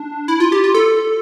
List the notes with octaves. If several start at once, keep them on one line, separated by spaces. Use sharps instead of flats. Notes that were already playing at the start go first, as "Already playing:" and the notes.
Already playing: D4
E4
F4
G4
F4
A4